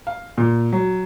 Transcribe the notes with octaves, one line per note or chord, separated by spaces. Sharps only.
F5
A#2
F#3